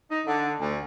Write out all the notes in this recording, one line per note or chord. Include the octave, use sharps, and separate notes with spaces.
D#4
D3
D2